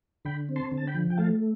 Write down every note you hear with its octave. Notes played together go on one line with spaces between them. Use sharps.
D3 G5 B5
C4
A5 C6
D3
A5
G5 B5
F3
G5
A3 F5 A5